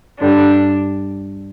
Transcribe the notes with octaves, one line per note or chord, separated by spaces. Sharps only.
G2 D3 G3 D4